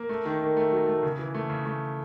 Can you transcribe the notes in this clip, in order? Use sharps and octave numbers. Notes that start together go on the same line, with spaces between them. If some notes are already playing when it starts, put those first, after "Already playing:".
Already playing: A#3
A3
D#3
D#3
A3
F#3
A3
C#3
E3
A3
C#3
A3